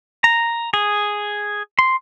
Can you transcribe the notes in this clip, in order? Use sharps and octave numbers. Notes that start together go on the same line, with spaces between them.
A#5
G#4
C6